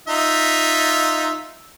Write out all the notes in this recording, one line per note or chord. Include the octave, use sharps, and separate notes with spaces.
D#4 F4 E5